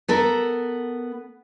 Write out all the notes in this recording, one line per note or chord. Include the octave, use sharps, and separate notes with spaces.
B3 A4 A#4